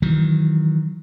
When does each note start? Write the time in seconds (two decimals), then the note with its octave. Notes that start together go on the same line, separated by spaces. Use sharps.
0.02 D#3 E3 F#3